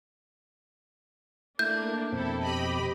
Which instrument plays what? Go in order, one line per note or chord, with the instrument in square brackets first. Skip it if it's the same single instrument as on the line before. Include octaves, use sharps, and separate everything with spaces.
[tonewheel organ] A3 E4 G#6 [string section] A#3 D4 [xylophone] G6
[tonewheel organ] F2 B2 C4 [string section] E4 A4
[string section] G4 D#5 B5